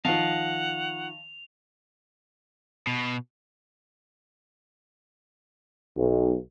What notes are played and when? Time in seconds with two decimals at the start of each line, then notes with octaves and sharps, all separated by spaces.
0.05 D#3 F3 D#5 F5 F#5 A5 F7
2.87 B2
5.97 B1